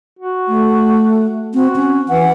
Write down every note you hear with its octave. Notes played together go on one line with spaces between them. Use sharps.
F#4
A3
C4 F#4
C#4
E3 F#5